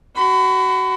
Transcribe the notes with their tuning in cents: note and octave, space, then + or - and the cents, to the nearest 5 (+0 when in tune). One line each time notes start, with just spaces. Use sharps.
F#4 +20 B5 +35